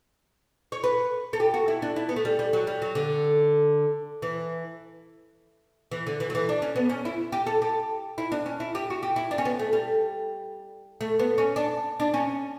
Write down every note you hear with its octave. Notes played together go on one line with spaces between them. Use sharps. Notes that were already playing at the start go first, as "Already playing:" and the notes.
C#5
B4
A4
G4
F#4
E4
D4
E4
B3
A3
G3
G3
F#3
G3
F#3
D3
E3
E3
D3
E3
F#3
E3
D4
C#4
B3
C#4
E4
G4
A4
G4
E4
D4
C#4
E4
G4
F#4
G4
E4
D4
C#4
B3
A3
G3
A3
B3
C#4
D4
D4
C#4